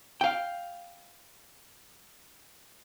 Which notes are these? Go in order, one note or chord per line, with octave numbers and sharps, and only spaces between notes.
F5 G5